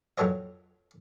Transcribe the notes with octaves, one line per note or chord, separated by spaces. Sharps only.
F2 A#2 F#3 A4 C#5 D#5